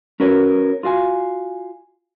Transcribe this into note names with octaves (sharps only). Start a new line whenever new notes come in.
C#4 F#4 A#4 B4 C#5
F4 F#4 F5 G#5